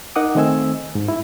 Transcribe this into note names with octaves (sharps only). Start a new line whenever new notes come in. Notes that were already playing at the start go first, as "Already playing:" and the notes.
D#4 A#4 F#5 D6 D#6
D#3 A3 C4 D#5 G#5 E6
G#2
E4